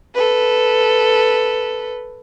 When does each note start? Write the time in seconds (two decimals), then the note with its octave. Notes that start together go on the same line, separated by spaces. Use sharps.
0.15 A4 B4